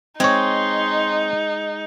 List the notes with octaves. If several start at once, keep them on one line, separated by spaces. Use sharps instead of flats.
G#3 C4 D#4 C#5 C6